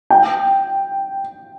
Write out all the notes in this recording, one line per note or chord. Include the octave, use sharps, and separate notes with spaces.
G5